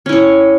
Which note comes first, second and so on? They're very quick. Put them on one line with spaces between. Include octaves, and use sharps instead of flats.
C#4 E4 C#5